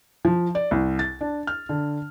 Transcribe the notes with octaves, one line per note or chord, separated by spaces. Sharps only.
F3
D5
C2
A6
D4
F6
D3